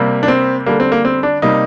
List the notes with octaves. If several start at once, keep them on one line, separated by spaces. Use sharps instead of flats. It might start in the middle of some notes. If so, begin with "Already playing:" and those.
Already playing: C3 G3 A#3
D4
C4
D3 G3 A#3
C4
A#3
C4
D4
C3 G3 A#3 D#4